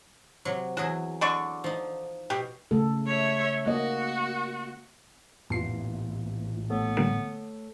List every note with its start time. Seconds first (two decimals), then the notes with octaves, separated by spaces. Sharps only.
0.45 C3 F#3
0.77 E2 F#3 F#4 G#4
1.21 D3 D5 C#6
1.64 F3 D#4
2.30 B2 G4
2.71 C#3 A3 A4
3.07 C#5 E5
3.67 A#3 F#4 D#5
5.50 A1 F2 A#2 E3 B3 F4 C7
6.70 A3 B3 A4 C#5
6.97 D3 G3 A#3